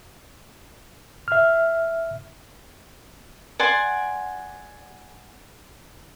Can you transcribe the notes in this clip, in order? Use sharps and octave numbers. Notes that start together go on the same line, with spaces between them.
E5 F6
D5 F#5 G#5 C6